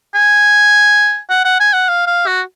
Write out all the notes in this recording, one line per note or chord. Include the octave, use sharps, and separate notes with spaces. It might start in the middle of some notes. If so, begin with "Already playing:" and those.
G#5
F#5
F#5
G#5
F#5
F5
F5
F#4